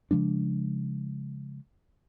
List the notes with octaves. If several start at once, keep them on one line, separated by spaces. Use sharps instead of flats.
C#3 F3 G#3 D4